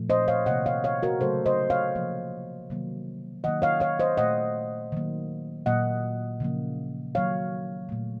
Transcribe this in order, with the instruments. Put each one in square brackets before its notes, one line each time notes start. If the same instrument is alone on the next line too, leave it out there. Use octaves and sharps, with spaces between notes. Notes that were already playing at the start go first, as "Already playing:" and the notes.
Already playing: [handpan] A#2 F3 A3
C5 D#5
C#5 F5
C3 D#3 A#3 D#5 F#5
C#5 F5
C#5 F5
F#4 A#4
C#3 F#3 A3 A4 C5
C5 D#5
C#5 F5
C3 F3 A#3
C3 D#3 F#3 A#3
D#3 F#3 A#3 D#5 F#5
C#5 F5
C#5 F5
C5 D#5
A#2 A3 D#5 F#5
D#3 F#3 A#3
A#2 F#3 A#3 D#5 F#5
C#3 F3 A#3
D#3 F#3 A#3 C#5 F5
A#2 A3